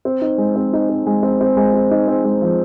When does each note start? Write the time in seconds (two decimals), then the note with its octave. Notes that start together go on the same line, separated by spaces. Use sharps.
0.05 C4
0.22 D#4
0.38 G#3
0.55 C4
0.73 D#4
0.89 C4
1.06 G#3
1.23 C4
1.41 C4
1.57 G#3
1.74 C4
1.91 D#4
2.08 C4
2.24 G#3
2.42 F3